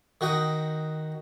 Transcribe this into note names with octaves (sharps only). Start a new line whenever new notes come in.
D#3 F#4 G5 D#6